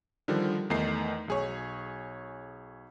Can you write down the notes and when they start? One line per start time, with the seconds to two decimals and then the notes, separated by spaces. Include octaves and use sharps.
0.28 D3 D#3 F3 G3
0.70 E2 D#3 A3 D#4 C7
1.28 B1 G#4 C#5